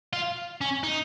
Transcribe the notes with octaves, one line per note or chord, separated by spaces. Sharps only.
F4
C#4
D#4